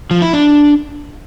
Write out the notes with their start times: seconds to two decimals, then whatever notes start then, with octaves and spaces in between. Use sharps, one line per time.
0.11 F3
0.22 E4
0.33 D4